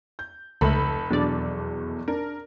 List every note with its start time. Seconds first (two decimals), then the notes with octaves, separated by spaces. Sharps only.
0.19 G6
0.61 F1 C#2 A3 A4 B5
1.11 E2 B2 F#3 D4 D5
2.08 D4 A#4